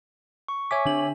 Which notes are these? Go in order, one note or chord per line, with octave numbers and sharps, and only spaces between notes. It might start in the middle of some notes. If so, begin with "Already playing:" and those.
C#6
C#5 E5 G#5 D6 B6
D3 D4 F#7